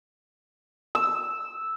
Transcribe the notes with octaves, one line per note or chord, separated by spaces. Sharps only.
E6